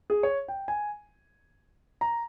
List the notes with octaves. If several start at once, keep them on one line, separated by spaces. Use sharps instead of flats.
G#4
C#5
G5
G#5
A#5